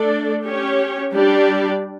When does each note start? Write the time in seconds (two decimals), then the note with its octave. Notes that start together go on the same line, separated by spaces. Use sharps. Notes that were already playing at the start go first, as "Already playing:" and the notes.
Already playing: A3 D4 A4 D5
0.47 C#4 G4 C#5
1.15 G3 D4 G4 D5